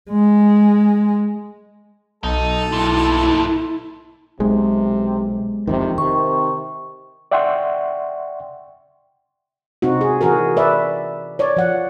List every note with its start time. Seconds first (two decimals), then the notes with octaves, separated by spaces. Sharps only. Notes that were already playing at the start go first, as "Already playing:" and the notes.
0.10 G#3
2.24 B1 D#4 A4
2.72 G2 A#2 E4
4.40 B1 C3 G#3
5.67 E1 F2 C3 D#3
5.98 C3 D#3 C#6
7.31 D5 E5 F#5 G5 C6 C#6
9.82 C3 C4 D#4 F#4
10.01 G#4
10.21 E3 F#4 G#4 A#4
10.57 B4 D5 E5
11.39 C#5 D5
11.57 F3 F#5